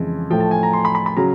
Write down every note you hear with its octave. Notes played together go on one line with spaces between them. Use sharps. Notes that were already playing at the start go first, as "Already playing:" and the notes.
Already playing: F2 C#3 E3 G#3
A2 F3 A3 G5
A5
G#5
A#5
C6
B5
B5
B5
C#3 F#3 A#5